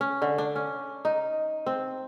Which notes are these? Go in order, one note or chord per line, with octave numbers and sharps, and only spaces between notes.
C#4
D3
D4
C#4
D#4
C4